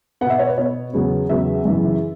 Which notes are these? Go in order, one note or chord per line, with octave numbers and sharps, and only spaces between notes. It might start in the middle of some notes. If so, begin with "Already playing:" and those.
B2 B3 E5 F#5
C#5
B4
B2 B3 C#5
E2 C#3 F#3 B3
E2 C#3 F#3 B3 E5
F#2 C#3 E3